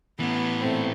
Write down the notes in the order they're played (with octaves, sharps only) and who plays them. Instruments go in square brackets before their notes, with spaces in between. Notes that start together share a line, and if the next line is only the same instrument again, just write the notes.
[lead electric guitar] A2 E3 [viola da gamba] B3
[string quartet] A#2 A3 C4